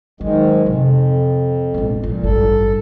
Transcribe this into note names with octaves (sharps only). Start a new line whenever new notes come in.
G#2 D#3 F#3 G#3
F2 C3
E1 A1
A#2 F3
A1 G2 A4